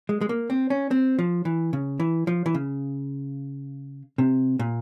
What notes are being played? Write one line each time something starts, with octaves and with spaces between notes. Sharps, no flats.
G#3
G#3
A#3
C4
C#4
C4
F3
E3
C#3
E3
F3
E3
C#3
C3
A#2